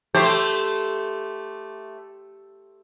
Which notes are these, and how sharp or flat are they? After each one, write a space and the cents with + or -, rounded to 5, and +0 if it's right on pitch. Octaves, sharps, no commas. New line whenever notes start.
A3 +0 G4 +0 C5 -5